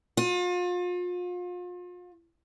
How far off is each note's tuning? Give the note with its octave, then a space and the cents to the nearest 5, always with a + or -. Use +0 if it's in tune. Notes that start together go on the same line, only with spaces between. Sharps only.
F4 +35